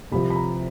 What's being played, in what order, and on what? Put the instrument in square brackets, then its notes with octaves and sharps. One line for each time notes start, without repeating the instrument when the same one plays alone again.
[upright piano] C2 C3 F3 B5
B5
A#5